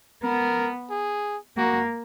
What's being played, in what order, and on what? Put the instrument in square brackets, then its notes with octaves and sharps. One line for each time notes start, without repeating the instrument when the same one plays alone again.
[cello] B3 [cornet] A#4
[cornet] G#4
[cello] A#3 [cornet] F#4